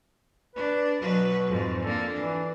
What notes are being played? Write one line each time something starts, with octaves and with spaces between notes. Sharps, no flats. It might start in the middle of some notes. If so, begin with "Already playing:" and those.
D4 B4
B2 F#3 B4
F2 G#2
D3 A#3 A4
E3 D4